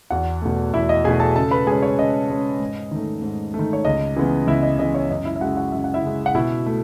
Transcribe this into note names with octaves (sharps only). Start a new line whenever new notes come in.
E2 F#4 F#5
B2 A3
E2 E4 E5
D#5
B2 A3 G#4 G#5
A4 A5
C#3 A4 A5
B4 B5
G#3 C#4 G#4 G#5
C#5
C#3 D#5
G#3 C#4
G#2
D#3 A3
G#2
A3
D#3
C#5
C#2 D#5
C#3 E3 G#3 B3
C#2 E4 E5
D#5
C#3 E3 G#3 B3 D#5
C#5
F#2 D#5
E4 E5
E5
C#3 G#3 F#4 F#5
F#4 F#5
F#2 E5
F#5
E4 E5
C#3 G#3
F#5
B2 E4 E5
A3